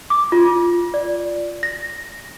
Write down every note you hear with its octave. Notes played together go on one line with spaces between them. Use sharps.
D6
F4
D5
A#6